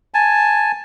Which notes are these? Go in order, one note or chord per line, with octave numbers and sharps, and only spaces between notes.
G#5 A5